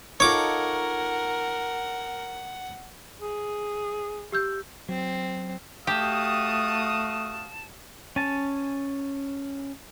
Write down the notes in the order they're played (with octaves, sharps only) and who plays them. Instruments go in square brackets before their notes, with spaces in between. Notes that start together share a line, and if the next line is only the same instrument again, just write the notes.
[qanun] D#4 F4 A4 [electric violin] A#4 [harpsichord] C#5 D6 [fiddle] F#5
[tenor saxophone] G#4
[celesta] G4 E6 G6
[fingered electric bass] F#3 [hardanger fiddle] C4
[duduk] A3 [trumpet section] F#4 F5 D#6 [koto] G4 [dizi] A5
[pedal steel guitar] C#4 G#5 A5